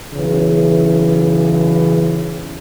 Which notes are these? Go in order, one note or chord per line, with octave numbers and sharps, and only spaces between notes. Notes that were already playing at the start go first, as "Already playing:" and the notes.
B1 C#3 E3